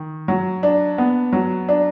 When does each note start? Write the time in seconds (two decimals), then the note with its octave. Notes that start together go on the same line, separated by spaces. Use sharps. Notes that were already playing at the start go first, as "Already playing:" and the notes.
Already playing: D#3
0.28 F#3
0.63 D4
0.98 B3
1.33 F#3
1.69 D4